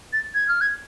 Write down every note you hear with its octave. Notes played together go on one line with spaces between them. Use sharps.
A6
G#6
F6
G#6